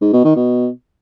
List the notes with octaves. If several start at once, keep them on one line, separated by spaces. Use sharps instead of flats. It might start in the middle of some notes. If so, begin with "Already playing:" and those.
G#2
B2
D#3
B2